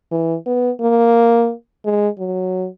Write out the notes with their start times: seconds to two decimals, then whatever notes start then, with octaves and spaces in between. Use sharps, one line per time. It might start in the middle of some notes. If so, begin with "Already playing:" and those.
0.12 E3
0.47 B3
0.81 A#3
1.85 G#3
2.19 F#3